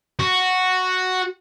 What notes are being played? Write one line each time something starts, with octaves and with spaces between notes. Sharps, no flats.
F#4